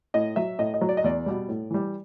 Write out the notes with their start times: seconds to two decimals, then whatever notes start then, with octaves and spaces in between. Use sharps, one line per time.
0.14 A2 D#5
0.36 F#3 E5
0.59 A2 D#5
0.74 D#5
0.81 F#3
0.89 D5
0.97 D#5
1.04 E2 D5
1.26 B2 G3
1.49 A2
1.71 E3 G3